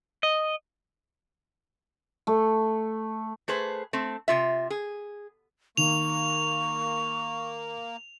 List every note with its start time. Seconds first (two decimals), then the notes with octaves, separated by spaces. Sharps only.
0.23 D#5
2.27 A3
3.48 A3 G#4 B4 C5
3.93 A3 C4
4.28 C3 F4 E5
4.70 G#4
5.77 D#3 A#3 C#6 F7